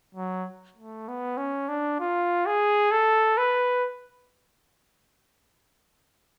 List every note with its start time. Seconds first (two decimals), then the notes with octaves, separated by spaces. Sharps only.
0.15 F#3
0.77 A3
1.08 B3
1.37 C#4
1.69 D4
2.00 F4
2.46 G#4
2.91 A4
3.38 B4